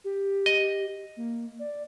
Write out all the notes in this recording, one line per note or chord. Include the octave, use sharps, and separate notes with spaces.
G4
D#5
A#3
D5